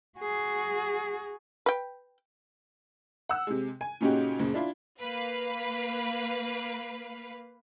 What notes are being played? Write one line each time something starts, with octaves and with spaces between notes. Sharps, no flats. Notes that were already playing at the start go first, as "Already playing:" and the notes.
F#4 G#4
B4 G5
F#5 E6
C3 G#3
G#5
A#2 C#3 C#4 D#4 F#4 G4
F#1 A#2 C#3
D4 E4 F4
A#3 B4 F5